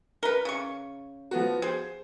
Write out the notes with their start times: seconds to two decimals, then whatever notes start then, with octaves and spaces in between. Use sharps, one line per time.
0.23 A#4 B4 G7
0.45 C#3 C#6
1.31 F3 B3 F#4
1.62 G#4 C5